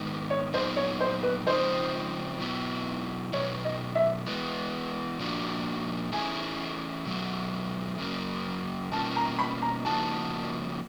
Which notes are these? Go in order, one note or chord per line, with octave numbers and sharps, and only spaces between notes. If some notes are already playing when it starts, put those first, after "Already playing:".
Already playing: G#2 D#3 G#3 B3
C#5
A#2 F#3 B3 D#4 G#4 C5
C#5
C5
B4
C#3 F3 G#3 C4 D#4 C5
B2 F#3 B3 E4
B2 F#3 A3 C#5
D#5
E5
E3 G#3 B3
A#2 F3 A#3 D4 F#4
E3 A3 C#4 E4 G#4 G#5
B2 F#3 A3
F#2 C#3 F#3 A#3
B2 G3 A#3 C#4 F4 A5
A#5
B5
A#5
C#3 F3 A#3 D#4 F#4 A5